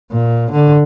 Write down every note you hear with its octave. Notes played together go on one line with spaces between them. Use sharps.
A#2
D3